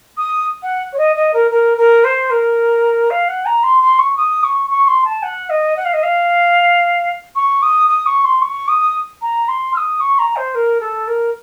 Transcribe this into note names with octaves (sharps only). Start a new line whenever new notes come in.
D#6
F#5
C#5
D#5
D#5
A#4
A#4
A#4
C5
A#4
F5
F#5
A#5
C6
C6
C#6
D#6
C#6
C#6
C6
A5
F#5
D#5
F#5
F5
D#5
F5
C#6
D#6
D#6
C#6
C6
C#6
D#6
A#5
C6
F6
D#6
C#6
A#5
C5
A#4
A4
A#4